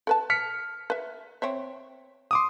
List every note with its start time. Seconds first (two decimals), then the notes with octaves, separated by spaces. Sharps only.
0.07 A4 B4 A5
0.30 F6 B6 C#7
0.90 B4 E5
1.42 C4 C#5 E5
2.31 C6 D6 D#6